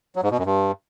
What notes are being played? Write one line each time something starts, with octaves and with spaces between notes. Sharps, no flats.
F#3
G#2
B2
F#2
G2